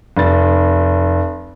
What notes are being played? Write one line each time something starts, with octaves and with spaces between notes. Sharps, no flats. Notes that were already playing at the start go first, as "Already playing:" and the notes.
F1 A6